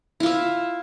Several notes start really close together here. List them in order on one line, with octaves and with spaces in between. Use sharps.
E4 F4 E5